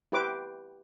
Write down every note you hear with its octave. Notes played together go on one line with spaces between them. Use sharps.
E4 G4 B4 C5 D6